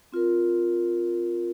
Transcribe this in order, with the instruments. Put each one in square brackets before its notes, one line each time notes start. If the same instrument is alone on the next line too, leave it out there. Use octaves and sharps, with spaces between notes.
[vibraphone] C4 F4 A#4